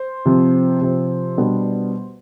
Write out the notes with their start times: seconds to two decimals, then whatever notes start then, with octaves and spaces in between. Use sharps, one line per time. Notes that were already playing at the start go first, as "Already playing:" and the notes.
Already playing: C5
0.25 C3 F3 C4
0.81 C3 F3 C4
1.37 B2 G3 B3 D4